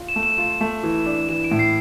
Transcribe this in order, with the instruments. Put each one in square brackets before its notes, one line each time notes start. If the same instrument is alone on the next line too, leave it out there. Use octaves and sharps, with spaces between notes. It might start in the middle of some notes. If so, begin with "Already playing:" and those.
Already playing: [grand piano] F4
[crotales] E7
[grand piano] A3
[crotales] E7
[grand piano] F4 [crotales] E7
[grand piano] A3
E3
D4
[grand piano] E3 [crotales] E7
[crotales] D7
[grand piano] A2
[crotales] C7